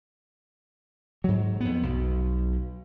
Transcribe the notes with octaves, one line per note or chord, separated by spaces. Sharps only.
G#2 F#3
F2 B3
B1